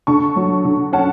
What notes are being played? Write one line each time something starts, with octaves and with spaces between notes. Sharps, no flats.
D3 A5 C#6
F#3
D3
C#4 F#5 A5